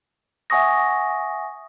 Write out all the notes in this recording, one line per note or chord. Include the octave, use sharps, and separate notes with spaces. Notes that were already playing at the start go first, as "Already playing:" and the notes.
E5 F#5 G#5 C#6 D#6 A#6